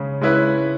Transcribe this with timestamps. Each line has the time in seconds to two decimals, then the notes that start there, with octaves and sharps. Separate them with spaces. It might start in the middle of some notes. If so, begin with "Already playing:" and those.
Already playing: C#3 G#3 C#4
0.22 G#3 C#4 E4 B4